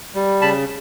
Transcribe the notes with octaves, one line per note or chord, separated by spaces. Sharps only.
G3
C#3 A5 B5